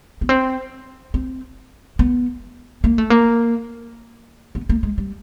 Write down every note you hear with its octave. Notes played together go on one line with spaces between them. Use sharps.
B3
C4
C4
B3
A#3
A3
A#3
B3
A#3
G#3
G3